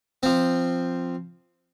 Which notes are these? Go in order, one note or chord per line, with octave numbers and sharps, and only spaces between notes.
F3 C4